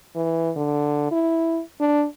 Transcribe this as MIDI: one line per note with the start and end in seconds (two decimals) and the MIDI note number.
0.16 0.51 52
0.57 1.07 50
1.11 1.60 64
1.80 2.06 62